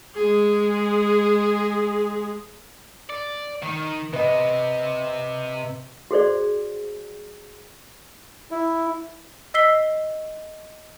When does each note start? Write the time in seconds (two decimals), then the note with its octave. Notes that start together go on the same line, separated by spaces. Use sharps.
0.15 G#3 G#4
3.10 D5
3.63 D#3
4.13 C3 B4 D#5
6.11 F#4 G#4 C5 D5
8.51 E4
9.54 D#5 E6 B6 C7 G7